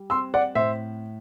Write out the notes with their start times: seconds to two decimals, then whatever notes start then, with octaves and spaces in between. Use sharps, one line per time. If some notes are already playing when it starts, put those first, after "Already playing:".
Already playing: G3
0.10 C4 C6 E6
0.34 D5 F#5
0.55 A2 C5 E5